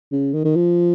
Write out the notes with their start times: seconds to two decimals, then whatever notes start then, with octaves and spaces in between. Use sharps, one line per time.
0.12 C#3
0.34 D#3
0.45 D#3
0.55 F3